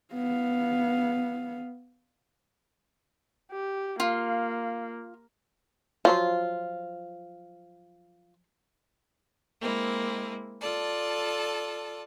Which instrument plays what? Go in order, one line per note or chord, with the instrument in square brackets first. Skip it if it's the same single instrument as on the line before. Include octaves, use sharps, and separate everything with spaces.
[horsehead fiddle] B3 F5
[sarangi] G4
[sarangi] A#3 [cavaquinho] F4
[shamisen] F3 F#3 C5 [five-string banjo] F4
[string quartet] G#3 A#3 C4 E4
F4 A4 D5 A5